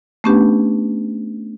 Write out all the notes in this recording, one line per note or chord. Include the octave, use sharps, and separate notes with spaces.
A3 B3 C#4 D4 G4 B4